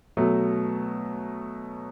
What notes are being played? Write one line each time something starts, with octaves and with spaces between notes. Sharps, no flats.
B2 F#3 A3